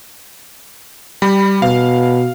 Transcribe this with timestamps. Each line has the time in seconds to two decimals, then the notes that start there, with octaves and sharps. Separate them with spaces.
1.22 G3 B5
1.62 B2 F5